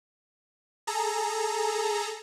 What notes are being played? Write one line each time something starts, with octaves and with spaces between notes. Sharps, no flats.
G#4 A4 A#5